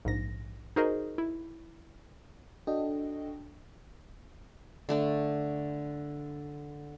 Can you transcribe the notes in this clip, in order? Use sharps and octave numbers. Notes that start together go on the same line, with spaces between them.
A#1 G#2 A#6
D#4 F#4 G#4 A#4 C5 D#5
E4
D4 F#4 A4 D#5 G5
D3 A3 D4